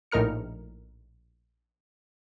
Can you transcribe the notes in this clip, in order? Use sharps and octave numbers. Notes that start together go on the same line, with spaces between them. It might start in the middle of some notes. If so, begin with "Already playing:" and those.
A#1 A2 D#4 A#4 F6 C#7